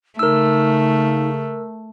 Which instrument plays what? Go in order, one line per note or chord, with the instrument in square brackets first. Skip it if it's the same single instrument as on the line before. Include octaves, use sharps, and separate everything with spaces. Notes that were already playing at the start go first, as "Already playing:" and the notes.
[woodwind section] C#3 [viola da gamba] A3 [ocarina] D#4 [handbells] A#4 E6